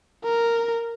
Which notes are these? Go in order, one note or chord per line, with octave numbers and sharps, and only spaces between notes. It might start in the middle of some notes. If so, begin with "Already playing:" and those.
A#4